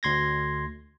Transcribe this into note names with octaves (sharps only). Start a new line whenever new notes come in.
D2 C6 G#6 A#6